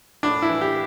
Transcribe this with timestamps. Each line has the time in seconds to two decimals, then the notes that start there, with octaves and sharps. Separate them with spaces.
0.23 A2 D4
0.42 E4
0.49 E3
0.61 G4